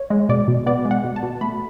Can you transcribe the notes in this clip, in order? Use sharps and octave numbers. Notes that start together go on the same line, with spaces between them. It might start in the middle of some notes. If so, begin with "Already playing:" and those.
Already playing: C#5
G#3
B2 D5
B2
B3 D5
G#3
F#5
B2
A5
B2
A3 B5